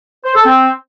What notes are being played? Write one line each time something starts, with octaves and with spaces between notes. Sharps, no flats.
C5
A4
C4